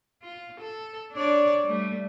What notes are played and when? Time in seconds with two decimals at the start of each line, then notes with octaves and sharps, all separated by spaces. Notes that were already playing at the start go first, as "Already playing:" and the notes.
0.22 F4
0.60 A4
1.12 D4 C#5 D5
1.64 G3 A3